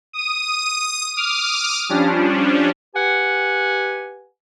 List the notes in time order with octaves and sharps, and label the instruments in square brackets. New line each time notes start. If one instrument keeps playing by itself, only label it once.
[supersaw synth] D#6 D#7
D6 D#6 F6
F3 G3 C#4 D4
[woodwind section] G4 B4 F#5 G#5